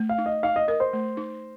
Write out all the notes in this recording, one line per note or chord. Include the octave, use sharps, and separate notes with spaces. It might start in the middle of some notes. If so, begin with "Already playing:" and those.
Already playing: A3
F5
D#4
D#5
D#4 F5
D#5
A#4 D#5
C5
A3
D#4